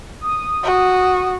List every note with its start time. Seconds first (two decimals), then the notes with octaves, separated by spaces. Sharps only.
0.21 D#6
0.64 F#4